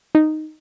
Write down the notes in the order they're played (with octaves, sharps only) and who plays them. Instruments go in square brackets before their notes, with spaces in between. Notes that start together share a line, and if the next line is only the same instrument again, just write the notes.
[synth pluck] D#4